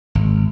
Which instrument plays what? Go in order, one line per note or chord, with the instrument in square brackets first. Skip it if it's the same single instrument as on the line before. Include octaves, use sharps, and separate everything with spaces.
[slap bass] G#1